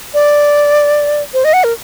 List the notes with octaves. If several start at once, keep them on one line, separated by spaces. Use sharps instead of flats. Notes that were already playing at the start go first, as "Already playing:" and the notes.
D5
C5
D#5
F#5
A#4